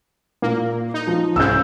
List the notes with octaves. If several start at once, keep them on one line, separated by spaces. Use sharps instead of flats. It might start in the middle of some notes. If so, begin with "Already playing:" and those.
A#2 A#3
D#4
F3
C2 G#2 C#3 E6 G6